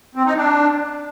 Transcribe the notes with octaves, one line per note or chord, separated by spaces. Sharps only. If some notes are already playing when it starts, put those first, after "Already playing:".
C4
D#4
D4